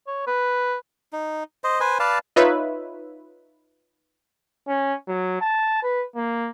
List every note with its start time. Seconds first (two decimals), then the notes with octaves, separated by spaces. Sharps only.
0.07 C#5
0.27 B4
1.13 D#4
1.64 C5 D#5
1.80 B4 C5 G#5
1.99 B4 D5 F5 A5
2.36 D#4 F4 B4 C#5 E5
4.68 C#4
5.08 F#3
5.41 A5
5.82 B4
6.16 A#3